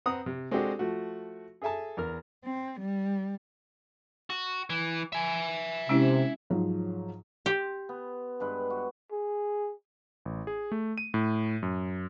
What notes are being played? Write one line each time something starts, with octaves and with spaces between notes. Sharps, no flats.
C4 B4 F#5 A#5 D#6
C3
G#3 C4 D4 F#4 G4 A4
F3 A3 F#4
G#4 A4 E5 G#5 A5
E2 A#4 F6
C4
G3
F#4
E3
E5 G#5
C3 G#3 C#4 E4
G#2 F3 F#3
G4 C6
B3
G2 G#3 B4
F#4
G#4
A1
G#4
A3
D#7
A2
F#2